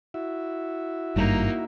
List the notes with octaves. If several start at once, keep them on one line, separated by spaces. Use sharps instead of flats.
E4 F#4 E5
G#1 G2 A#3 D#4